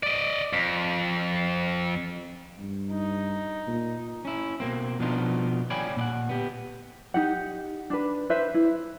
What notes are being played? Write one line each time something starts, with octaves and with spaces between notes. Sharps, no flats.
D5 D#5
F2
G2
D#4
A#2
C#4 E4
B2 A#3 C4
B2 F3 B3 D4 D#4 F4
C#5 D5 F5 G5 G#5 B5
A#2 D5 F#5
B3 G4
D#4 G4 F#5
D4 B4
B4 C5 E5
E4